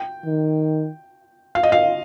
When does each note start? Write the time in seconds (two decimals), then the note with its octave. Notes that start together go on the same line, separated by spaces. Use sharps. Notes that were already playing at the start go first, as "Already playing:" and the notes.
Already playing: G5
0.26 D#3
1.55 F5
1.63 D#5
1.72 F5